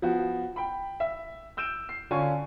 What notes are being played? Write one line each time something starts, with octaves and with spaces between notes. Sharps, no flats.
F3 B3 F#4
G5 B5
E5
E6 G6 D7 E7
C7
D3 C#4 F4 G#5 C#6